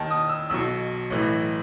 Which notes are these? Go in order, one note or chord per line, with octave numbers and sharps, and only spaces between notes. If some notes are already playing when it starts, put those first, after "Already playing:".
Already playing: D#2 D#3 A5
D#6
E6
B1 B2 E6
B1 A2 E3